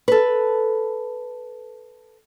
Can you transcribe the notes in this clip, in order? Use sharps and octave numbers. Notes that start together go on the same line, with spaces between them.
A4 B4